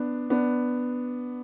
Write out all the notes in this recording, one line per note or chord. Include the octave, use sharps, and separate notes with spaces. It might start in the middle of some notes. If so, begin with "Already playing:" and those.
Already playing: B3 D4
B3 D4